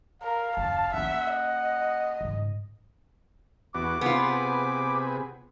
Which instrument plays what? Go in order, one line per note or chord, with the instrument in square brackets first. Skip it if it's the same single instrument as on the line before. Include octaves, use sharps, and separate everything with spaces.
[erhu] A#4 [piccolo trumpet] F5
[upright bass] F#1 D#2 [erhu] A5
[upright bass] A#3 C#4 [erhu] E5 [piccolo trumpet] F#5
[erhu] D#5
[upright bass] G#2 C#3
[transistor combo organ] E2 B3 F#4 [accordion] D6
[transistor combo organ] C3 G#4 B4 [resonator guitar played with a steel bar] B3 F4